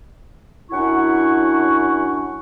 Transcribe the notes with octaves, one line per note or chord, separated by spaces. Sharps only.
F#2 D4 E4 F#5 C#6